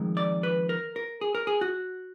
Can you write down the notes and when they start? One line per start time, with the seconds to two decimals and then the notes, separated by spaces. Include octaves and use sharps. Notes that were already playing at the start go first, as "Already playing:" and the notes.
Already playing: F2 D#3 G#3
0.17 D5
0.43 B4
0.69 A#4
0.96 A#4
1.21 G#4
1.35 A#4
1.47 G#4
1.61 F#4